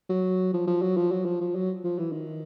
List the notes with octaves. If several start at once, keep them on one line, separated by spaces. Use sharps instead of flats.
F#3
F3
F3
F#3
F3
F#3
F3
F3
F#3
F3
E3
D#3